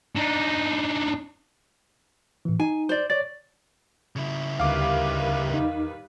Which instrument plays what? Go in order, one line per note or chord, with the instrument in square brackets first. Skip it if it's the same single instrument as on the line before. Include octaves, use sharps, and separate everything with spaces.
[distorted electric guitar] D4 D#4
[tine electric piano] A2 E3
[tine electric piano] D#4 [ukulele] G#5
[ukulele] C5 D5
[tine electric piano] C#5 A6 [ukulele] D5
[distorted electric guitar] C#3 E4
[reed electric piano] D2 [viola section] D#3 G3 B4 [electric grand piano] F5 D6
[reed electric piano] E2 D#4